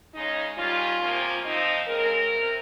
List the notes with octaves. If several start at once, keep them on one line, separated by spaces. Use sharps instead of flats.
C#3 G#3 C#4 D#4
D#3 G3 C#4 F4
C3 F3 A#3 C#4
F3 C4 D#4
C#3 G#3 C4 A#4
C3